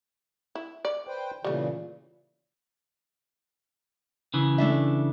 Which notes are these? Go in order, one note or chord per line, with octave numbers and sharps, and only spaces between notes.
E4
D5
B4 C5 G5
A#2 C#3 E3 G3 A3
C#3 E3
A3 D4 E5